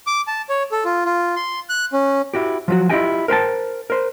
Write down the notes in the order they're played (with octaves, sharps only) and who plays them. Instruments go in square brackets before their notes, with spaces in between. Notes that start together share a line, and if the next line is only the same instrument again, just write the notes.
[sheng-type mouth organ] D6
A5
C#5
A4
F4
F4
C6
F#6
C#4
[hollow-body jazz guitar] E4 F#4 G4
F3 F#3 F#4
E4 F4 G4 D#5 G5 G#5
A#4 C5 G5 A5
A#4 C5